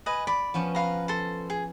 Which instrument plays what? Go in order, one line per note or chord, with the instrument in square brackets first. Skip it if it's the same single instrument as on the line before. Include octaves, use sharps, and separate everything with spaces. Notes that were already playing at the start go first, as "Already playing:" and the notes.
[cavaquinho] B4 D#5 G#5
[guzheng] D5 [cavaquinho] B5
[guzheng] F3 B3 C#4
[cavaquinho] B4 F5 A#5
A4 C5
G#4